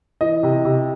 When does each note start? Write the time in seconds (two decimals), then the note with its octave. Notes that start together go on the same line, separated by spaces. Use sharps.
0.21 E3 D#5
0.43 C3
0.65 C3